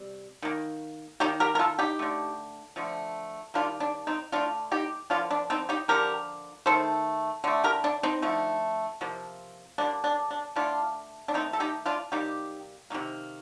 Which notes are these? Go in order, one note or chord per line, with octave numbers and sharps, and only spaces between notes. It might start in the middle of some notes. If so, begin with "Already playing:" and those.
Already playing: C3 G3
D#3 A#3
D#3 G3 A#3 D#4 G4
G4 A#4
A#4
F4 A4
D#4 G4
D3 A3
D3 F3 A3
D#3 G3 A#3 D4 F4
D4
C4 D#4
D3 A3 D4 F4
D#4 G4
D3 F3 A#3 D4 F4
D4
C4 D#4
D#4 G4
D3 F3 A#3 G4 A#4
D#3 A3 A4 C5
D3 A3
G4 A#4
D4
C4 D#4
D3 F3 A3
C3 F3 A#3
D3 G3 A#3 D4
D4
D4
D3 A3 D4 F4
D4
D#3 A3 C4 D#4
A4
D#4 G4
D4 F4
C3 G3 A#3 D#4 G4
C3 D#3 A#3